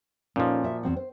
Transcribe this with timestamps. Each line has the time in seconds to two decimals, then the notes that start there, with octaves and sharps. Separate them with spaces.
0.36 A#2 F3 C#4 D#4 A4
0.63 F#4 E5
0.83 E2 C4 F#4
0.96 C5